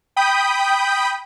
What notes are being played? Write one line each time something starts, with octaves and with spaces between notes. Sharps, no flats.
G5 B5 D#6 G6 B6 D#7